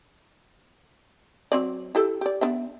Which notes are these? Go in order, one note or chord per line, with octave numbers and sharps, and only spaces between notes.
F#3 C4 D5
E4 G4 A4
G4 D5
B3 D4 E5